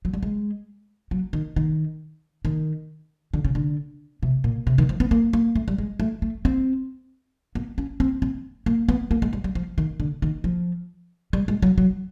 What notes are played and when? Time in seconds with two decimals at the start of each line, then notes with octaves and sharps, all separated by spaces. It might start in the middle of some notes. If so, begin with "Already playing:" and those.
0.05 F#3
0.14 G3
0.23 G#3
1.11 F#3
1.33 D#3
1.56 D#3
2.45 D#3
3.34 D3
3.44 C#3
3.55 D3
4.23 C3
4.44 A#2
4.67 C3
4.78 D#3
4.89 F3
5.00 B3
5.11 A#3
5.33 A#3
5.55 A3
5.68 G3
5.78 G#3
6.00 A3
6.22 A3
6.45 C4
7.55 B3
7.78 C#4
8.00 C4
8.22 C4
8.66 A#3
8.89 B3
9.11 A#3
9.22 G#3
9.33 G3
9.44 G3
9.55 F3
9.78 D#3
10.00 D3
10.22 D#3
10.44 F3
11.33 G3
11.48 G#3
11.62 F#3
11.78 F#3